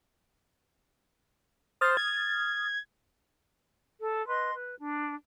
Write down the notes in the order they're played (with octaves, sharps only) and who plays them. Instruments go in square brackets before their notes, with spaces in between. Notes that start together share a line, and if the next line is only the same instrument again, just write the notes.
[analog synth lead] C5 [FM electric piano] D#6 F6 A6
[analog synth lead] G#6
[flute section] A4
B4 D#5 C6
B4
D4